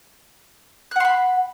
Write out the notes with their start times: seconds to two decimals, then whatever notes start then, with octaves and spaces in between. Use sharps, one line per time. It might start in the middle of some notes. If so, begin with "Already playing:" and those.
0.91 F#6
0.96 F#5
1.00 C6
1.05 B5